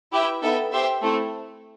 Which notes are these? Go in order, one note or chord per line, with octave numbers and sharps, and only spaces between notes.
E4 G4 B4 E5 G5
B3 D#4 A4 E5 G5
G4 C5 E5 G5
A3 C4 E4